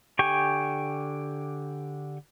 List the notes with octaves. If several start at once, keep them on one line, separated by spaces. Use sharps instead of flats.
D3 G4 G5 G#5 C#6